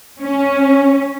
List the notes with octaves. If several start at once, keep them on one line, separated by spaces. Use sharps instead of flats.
C#4